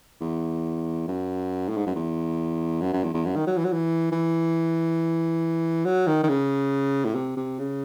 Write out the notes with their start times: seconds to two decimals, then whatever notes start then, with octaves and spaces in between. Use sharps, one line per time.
0.21 E2
1.08 F#2
1.69 A2
1.77 G#2
1.87 F#2
1.96 E2
2.81 F#2
2.93 F#2
3.04 E2
3.14 E2
3.25 F#2
3.36 D#3
3.47 F#3
3.58 E3
3.65 F#3
3.73 E3
4.12 E3
5.85 F#3
6.07 D#3
6.23 D#3
6.29 C#3
7.05 A2
7.15 C3
7.37 C3
7.59 C#3